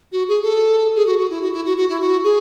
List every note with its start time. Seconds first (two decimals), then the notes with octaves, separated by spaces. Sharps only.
0.12 F#4
0.28 G#4
0.43 A4
0.96 G#4
1.07 F#4
1.19 F#4
1.30 E4
1.42 F#4
1.53 E4
1.66 F#4
1.77 F#4
1.89 E4
2.01 F#4
2.24 G#4